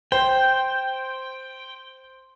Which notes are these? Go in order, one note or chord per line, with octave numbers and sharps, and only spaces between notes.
C5 G5